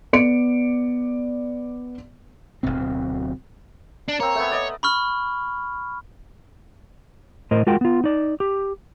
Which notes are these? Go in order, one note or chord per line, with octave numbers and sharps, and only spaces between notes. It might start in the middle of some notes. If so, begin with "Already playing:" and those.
B3 D5 C#7 D7
D1 G1 B2 C4
D4
A#3 C4 C#5
A3 B3
D5 D#5
B5 C#6 F6
A2 A#4 C5 D#5
G#3 F4 F#4 A#4 G5
B3 F4
D#4 D5
G4